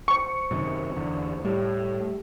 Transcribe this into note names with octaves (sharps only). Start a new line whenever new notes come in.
C5 C#6 C#7
F#2 C3 D#3
E2 D3
A2 G3 G4